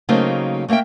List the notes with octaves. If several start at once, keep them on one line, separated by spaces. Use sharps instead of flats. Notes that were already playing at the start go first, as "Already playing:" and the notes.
C#3 F#3 A3 A#3 C4 D#4
A3 A#3 A#4 E5 G5